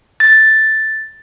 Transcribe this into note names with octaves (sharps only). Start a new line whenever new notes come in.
A6